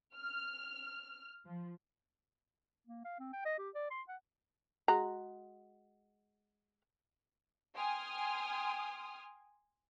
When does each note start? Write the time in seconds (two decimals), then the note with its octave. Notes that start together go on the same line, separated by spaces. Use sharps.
0.15 F6
1.45 F3
2.87 A#3
3.05 F5
3.20 C4
3.33 G5
3.45 D#5
3.58 G4
3.75 D5
3.91 C6
4.08 F#5
4.88 G#3 F#4 A#5
7.76 G5 G#5 C6 D#6 F6